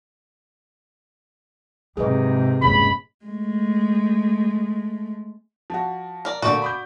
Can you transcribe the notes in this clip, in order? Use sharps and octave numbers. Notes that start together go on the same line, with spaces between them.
G#2 C3 F#3 G#4 B4 D#5
D#1 G2 A#2 G#3 C#4 B5
G#3 A3
F3 F#4
A#4 D5
A#2 D3 A3 F#4 D5
B5 D6 G6